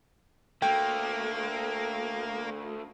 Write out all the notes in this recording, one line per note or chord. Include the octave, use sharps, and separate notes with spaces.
D3 A3 A#3 G5